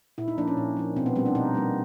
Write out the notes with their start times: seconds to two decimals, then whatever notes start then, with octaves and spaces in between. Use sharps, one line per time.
0.18 A#2 E4
0.28 D#4
0.38 F3 A#3 D4
0.48 C#4
0.57 A#2
0.77 F3 A#3
0.96 B2 C4
1.06 B3
1.16 G3 A#3 C4
1.26 D4
1.35 B2 D#4
1.55 G3 A#3